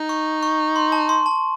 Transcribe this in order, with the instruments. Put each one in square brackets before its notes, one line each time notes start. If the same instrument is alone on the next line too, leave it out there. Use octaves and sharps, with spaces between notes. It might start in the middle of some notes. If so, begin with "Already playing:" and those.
Already playing: [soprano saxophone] D#4
[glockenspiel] C#6
C#6
C6
A5
C6
A5